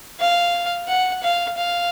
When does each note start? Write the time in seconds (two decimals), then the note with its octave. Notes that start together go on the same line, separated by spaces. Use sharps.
0.20 F5
0.88 F#5
1.23 F5
1.57 F5